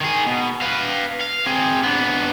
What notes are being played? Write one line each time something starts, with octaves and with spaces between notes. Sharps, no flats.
D#3 G#4
B2
B4 F5
F5
C4 G#4
B3 D4